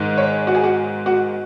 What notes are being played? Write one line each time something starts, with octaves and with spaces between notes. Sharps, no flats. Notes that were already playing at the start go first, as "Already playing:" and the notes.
Already playing: G#2 D#3 G#3
C#5
F#4
G#4
F#4
F#4